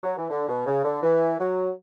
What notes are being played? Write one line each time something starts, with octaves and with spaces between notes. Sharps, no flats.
F#3
E3
D3
B2
C#3
D3
E3
F#3